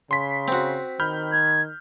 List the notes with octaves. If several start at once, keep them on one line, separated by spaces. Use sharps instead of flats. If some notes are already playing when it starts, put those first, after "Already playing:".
C#3 C6 B6
C4 F#4
D#3 B5 F6 G6
G#6